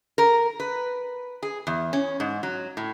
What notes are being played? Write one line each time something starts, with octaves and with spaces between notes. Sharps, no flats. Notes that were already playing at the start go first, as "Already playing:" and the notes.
A#4
B4
G#4
E2
C#4
G#2
F#3
A2